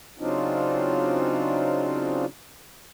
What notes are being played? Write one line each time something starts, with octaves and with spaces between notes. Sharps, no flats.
C#3 F#3 C4 D4 D#4 F4